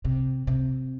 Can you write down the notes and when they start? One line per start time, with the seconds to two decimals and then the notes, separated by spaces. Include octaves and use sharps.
0.05 C3
0.47 C3